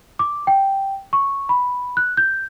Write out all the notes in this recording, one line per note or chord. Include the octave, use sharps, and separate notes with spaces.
D6
G5
C#6
B5
F#6
G6